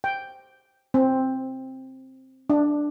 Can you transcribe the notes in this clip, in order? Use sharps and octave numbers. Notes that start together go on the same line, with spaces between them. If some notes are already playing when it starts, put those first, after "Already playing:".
G5
C4
D4